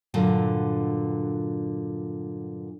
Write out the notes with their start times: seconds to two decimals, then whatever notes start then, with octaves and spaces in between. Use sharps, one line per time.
0.14 G2 A#2 D3 F#3